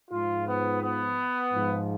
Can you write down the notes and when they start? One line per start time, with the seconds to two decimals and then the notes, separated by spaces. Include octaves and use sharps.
0.11 G#2 F3 F4
0.47 B3
0.82 B3
1.54 G#2 F3